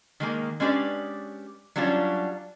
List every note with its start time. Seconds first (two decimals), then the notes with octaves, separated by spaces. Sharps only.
0.20 D#3 G#3 A#3
0.60 G#3 C#4 D4 G4 B4 D5
1.76 F#3 G3 C#4 D4 F4